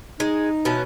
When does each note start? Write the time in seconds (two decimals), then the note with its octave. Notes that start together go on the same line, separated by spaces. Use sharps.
0.20 G#3 D#4
0.65 B2 E3 C#4